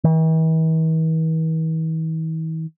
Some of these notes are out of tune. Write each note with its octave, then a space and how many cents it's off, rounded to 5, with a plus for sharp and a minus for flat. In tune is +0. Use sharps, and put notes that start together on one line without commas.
E3 -45